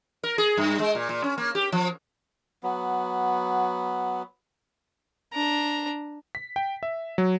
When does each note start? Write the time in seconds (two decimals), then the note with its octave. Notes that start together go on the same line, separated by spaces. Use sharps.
0.23 A#4
0.38 G#4
0.57 G2
0.79 G#3
0.95 A#2
1.09 A#2
1.24 C#4
1.38 A#3
1.55 G4
1.72 F3
2.63 F#3 B3
5.34 D4 A#5
6.35 B6
6.56 G5
6.83 E5
7.18 F#3